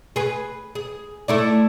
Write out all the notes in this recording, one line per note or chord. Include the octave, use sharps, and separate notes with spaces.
G#4 B4
G#4
A3 E4 D5